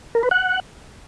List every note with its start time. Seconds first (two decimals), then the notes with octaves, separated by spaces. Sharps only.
0.15 A#4
0.23 B4
0.31 F#5